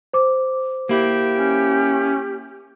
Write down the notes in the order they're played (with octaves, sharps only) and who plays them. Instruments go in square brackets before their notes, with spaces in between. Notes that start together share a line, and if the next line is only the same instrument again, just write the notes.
[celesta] C5 D6
[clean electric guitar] A#3 E4 [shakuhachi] G4
[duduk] C#4